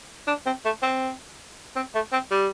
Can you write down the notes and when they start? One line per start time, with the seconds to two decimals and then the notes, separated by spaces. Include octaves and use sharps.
0.27 D4
0.46 C4
0.65 A3
0.82 C4
1.76 C4
1.95 A3
2.12 C4
2.31 G3